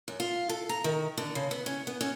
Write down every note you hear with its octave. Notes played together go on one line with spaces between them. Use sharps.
F#2
F4
A4
A#5
D#3
D3
C#3
B3
C#4
B3
C#4